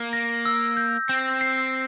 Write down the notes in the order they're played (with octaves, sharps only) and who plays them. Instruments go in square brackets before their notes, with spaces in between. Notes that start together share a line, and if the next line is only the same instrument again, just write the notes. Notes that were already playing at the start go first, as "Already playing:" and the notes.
Already playing: [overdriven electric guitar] A#3
[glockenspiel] A#6
E6
G6
[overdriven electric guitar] C4 [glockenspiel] G6
[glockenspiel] C7